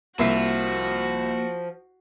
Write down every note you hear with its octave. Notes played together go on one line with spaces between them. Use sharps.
C2 F3 A#3 F#4 E5 C7